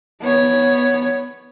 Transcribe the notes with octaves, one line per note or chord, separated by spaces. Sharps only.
B3 C#5